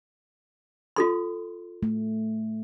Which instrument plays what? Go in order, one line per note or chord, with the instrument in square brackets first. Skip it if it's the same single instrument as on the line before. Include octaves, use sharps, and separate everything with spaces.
[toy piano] F4 A4 C6
[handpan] A3